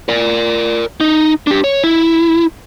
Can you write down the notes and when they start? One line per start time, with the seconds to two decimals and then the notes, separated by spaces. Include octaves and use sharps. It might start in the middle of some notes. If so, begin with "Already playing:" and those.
0.09 A#4 D5
1.00 D#4
1.47 D4 G4
1.64 C#5
1.83 E4